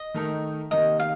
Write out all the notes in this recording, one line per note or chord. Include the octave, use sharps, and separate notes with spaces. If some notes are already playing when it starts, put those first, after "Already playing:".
Already playing: D#5
D#3 A3 D#4 A#4
C3 D#3 A#3 D#4 A#4 D#5
F5